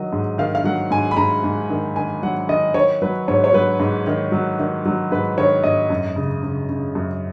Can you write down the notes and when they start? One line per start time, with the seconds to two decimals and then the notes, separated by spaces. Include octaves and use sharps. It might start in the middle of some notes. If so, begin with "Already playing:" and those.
Already playing: D#3 F#3 D#5
0.13 G#2
0.38 D#3 F5
0.55 F5
0.64 F#3 F#5
0.91 G#2 G#5
1.11 B5
1.17 G#2 A#5
1.44 G#2
1.70 D#3
1.96 D#3 G#5
2.23 F#3 F#5
2.49 D#3 D#5
2.74 D#3 C#5
3.02 F#3 B4
3.28 G#2 C#5
3.44 C#5
3.53 F#3 B4
3.80 G#2
4.07 D#3
4.32 F#3
4.59 D#3
4.85 F#3
5.11 G#2 B4
5.38 D#3 C#5
5.63 G#2 D#5
5.90 F#2
6.16 C#3
6.43 C#3
6.69 C#3
6.95 F#2